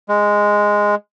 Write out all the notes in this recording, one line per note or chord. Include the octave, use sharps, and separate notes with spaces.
G#3